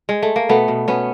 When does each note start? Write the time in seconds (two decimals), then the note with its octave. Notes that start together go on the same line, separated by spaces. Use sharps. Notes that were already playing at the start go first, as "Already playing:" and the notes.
0.09 G#3
0.23 A3
0.36 A#3
0.49 B2 A3 B3
0.68 B2
0.88 B2 B3 C#4